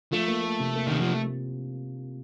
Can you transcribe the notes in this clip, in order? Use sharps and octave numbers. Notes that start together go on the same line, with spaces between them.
F3 A3
A#3
A#3
C3
A#3
C3 D#3
F3